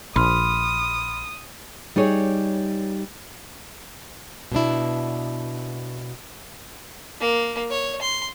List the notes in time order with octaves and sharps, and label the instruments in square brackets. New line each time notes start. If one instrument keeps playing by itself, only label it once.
[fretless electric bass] A#1 [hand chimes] B5 C6 F6 [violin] D#6
[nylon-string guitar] G3 D#4 G#4 C#5
B2 B3 D4 E4
[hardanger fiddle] A#3
C#5
C6